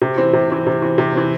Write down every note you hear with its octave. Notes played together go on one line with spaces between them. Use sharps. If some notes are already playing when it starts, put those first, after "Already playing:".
C3
E3 C4
C3
E3 C4
C3
E3 C4
C3
E3 C4